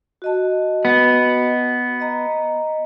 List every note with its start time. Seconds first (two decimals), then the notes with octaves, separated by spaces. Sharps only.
0.22 F#4 D#5 A5
0.85 B3
2.00 D#5 A#5